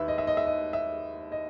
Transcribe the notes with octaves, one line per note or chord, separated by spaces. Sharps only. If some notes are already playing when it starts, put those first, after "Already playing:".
Already playing: D#2 D#3 B4 E5
D#5
E5
D#5
E5
D#5
E5
D#5